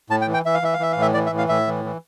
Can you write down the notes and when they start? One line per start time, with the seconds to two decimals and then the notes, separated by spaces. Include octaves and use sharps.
0.10 A2 A5
0.21 G5
0.28 E3
0.34 G5
0.45 E3 E5
0.54 F5
0.62 E3 E5
0.73 F5
0.79 E3 E5
0.92 A2 F5
1.02 E5
1.14 E3 D5
1.26 E5
1.32 A2
1.38 F5
1.49 A2 E5
1.67 E3
1.85 E3